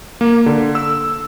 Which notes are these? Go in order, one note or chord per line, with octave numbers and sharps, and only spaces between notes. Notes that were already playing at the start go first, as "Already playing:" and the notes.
A#3
D3
E6